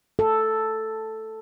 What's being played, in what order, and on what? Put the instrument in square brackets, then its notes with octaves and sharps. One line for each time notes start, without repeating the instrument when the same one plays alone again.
[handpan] A4